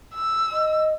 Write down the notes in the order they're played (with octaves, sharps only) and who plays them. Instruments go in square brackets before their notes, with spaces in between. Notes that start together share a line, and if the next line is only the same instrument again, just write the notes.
[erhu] E6
[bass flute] D#5